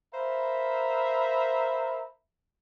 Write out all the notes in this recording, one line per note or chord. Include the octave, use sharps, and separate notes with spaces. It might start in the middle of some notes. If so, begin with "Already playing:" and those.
A#4 C5 E5 F5 A#5 B5